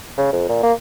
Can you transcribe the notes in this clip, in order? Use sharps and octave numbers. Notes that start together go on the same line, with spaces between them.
C#3
F2
A#2
A#3